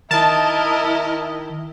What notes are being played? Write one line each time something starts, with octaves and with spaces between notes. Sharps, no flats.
D#3 E4 A#4 D#5 A5